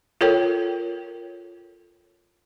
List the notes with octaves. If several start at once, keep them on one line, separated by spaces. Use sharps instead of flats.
F4 A4 A#4 C#5 G5